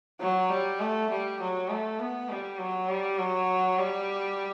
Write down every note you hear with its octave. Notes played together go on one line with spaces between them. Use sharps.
F#3
G3
A3
G3
F#3
A3
B3
G3
F#3
G3
F#3
G3